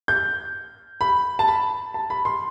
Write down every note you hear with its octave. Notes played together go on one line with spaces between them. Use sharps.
G6
B5
A5
B5
A5
B5
C6